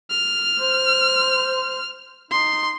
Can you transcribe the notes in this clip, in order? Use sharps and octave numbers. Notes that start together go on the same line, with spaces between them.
F6
C5
D#4 C6